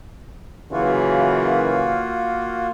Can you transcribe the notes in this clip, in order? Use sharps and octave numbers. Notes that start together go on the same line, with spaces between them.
F#2 C#3 E3 A#3 F4 F#4